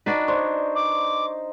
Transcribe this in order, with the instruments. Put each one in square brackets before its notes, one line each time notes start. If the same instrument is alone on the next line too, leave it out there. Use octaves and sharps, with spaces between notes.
[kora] D4 F#4 B4 [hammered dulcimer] D#4
[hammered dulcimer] C5 [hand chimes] D5 C#6
[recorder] D6